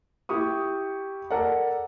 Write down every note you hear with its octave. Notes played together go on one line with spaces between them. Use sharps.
E4 G4 C#6 D#6
A4 A#4 D5 F#5